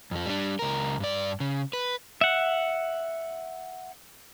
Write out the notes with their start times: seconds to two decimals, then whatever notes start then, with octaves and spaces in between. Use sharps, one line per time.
0.11 F2 F3
0.26 G3 D4
0.59 C#2 A#4
1.00 G2 D5
1.40 C#3
1.73 B4
2.21 E5 F#5